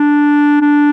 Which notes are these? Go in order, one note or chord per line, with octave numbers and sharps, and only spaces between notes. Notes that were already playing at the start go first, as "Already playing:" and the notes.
Already playing: D4
D4